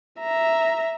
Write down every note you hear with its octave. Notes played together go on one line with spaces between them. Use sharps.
E5 A#5